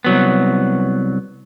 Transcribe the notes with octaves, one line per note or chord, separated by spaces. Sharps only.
C2 F#3 B3